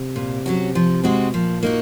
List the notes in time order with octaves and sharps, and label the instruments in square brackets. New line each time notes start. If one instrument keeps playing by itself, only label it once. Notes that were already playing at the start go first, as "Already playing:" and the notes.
Already playing: [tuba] C3
[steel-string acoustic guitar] A#2
F#3 C#4 F#4
F3
G#3 C4 F#4
[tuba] A#2 [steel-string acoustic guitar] F3
[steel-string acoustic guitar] A#3 D#4 F#4